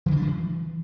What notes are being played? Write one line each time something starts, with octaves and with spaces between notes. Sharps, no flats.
E3
C#3
D4
D3
E3